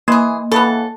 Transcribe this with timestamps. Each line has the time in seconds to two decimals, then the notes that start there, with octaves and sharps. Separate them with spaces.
0.08 E3 A#3 G#4
0.52 C#3 E3 B3 A4